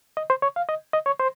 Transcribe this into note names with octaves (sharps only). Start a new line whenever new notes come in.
D#5
C5
C#5
F5
D#5
D#5
C#5
C5